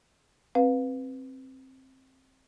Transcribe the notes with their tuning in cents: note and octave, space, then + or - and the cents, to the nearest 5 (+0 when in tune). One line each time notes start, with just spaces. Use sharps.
C4 +15 B4 +0 F5 +25